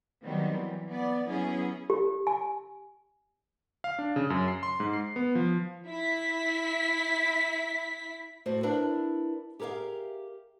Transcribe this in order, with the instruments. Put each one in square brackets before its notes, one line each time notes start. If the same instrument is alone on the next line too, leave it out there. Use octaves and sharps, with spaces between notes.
[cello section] D#3 F#3 G3 B3 C4
E3
B3 D5
F#3 B3 C#4 E4 G#4
[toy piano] G4
G#5
[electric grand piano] F5
D4
C#3
F#2
C7
C6
G#2
C7
B3
F3
[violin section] E4 B6
[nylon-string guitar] A2 F#4 C5
D4 E4 A#4 B4
G4 G#4 A#4 E5 F5